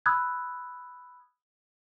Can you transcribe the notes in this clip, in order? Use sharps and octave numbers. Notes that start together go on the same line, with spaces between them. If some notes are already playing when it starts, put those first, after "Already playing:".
B5 D#6 E6 F#6 G#6